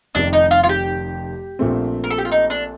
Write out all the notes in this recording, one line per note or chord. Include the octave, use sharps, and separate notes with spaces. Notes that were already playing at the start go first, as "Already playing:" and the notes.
F1 F2 C3 D#3 D4
D#4
F4
F4
G4
A#1 A#2 A3 C4
A#4
A4
G4
F4
D#4
D4